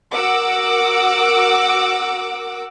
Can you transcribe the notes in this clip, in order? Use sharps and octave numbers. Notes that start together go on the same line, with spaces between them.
F#4 A#4 F#5 D6 E6 D7